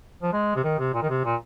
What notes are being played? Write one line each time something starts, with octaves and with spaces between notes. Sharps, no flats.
F3
G#3
C3
D#3
C3
A#2
D#3
C3
A#2